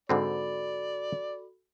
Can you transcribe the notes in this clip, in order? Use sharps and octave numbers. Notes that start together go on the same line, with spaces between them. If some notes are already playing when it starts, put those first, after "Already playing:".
G#2 D3 C4 F#4 A4 D5 B5